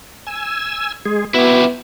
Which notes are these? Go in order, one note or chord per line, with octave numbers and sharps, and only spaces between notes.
G#5 E6
G#3 G#4
B3 E4 F#4 G4